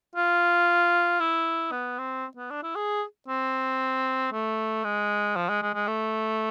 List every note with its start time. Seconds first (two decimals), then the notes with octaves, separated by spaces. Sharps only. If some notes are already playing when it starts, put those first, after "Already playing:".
0.15 F4
1.20 E4
1.72 B3
1.98 C4
2.37 B3
2.50 D4
2.63 E4
2.75 G#4
3.28 C4
4.32 A3
4.84 G#3
5.36 F3
5.49 G#3
5.62 G#3
5.74 G#3
5.87 A3